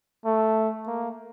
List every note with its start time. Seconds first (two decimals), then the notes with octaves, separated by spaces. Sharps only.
0.25 A3
0.87 A#3